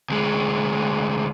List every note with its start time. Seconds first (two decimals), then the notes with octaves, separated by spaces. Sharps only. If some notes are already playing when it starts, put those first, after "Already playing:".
0.10 D2 G#3